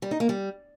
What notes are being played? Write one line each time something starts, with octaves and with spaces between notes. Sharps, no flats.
G3
D#4
A#3
G3